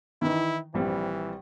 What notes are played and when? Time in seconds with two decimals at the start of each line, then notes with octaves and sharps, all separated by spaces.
0.22 D#3 E3 D#4 E4
0.74 A#1 E3 G3 C4